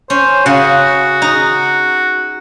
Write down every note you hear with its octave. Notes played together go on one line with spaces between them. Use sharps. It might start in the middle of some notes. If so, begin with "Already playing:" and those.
C#4 C5
C#3 F#4
D#4